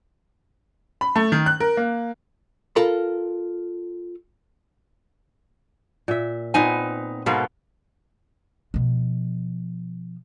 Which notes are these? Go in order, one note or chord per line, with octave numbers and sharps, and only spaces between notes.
B5
A3
D#3
F#6
A#4
A#3
F4 A4 A#4 B5
A#2 E5
A#2 B3 C4 D#4 G#5
G#2 B2 A#3 B3 A4 A#4
B2 F3